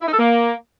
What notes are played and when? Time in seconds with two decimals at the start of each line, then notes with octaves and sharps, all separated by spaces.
0.02 E4
0.08 D#4
0.13 A4
0.19 A#3